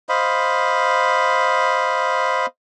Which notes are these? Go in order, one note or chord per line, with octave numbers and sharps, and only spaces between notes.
C5 D#5 F5 B5